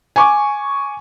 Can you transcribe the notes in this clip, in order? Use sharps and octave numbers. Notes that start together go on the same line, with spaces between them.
G#5 C#6 D6